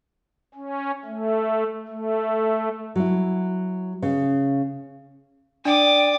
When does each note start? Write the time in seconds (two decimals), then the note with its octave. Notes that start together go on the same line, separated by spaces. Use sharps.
0.55 C#4
1.05 A3
1.88 A3
2.96 F#3 E4
4.02 C#3
5.65 D4 D5 G5 D6 D#6